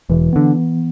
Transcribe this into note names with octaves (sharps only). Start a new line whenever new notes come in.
E1 E3
D3 B3